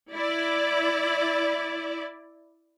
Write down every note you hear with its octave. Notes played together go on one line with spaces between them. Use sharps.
E4 D5